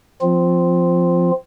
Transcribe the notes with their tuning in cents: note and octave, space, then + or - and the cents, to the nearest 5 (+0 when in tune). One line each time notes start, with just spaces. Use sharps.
F3 +0 C4 -15 F4 +0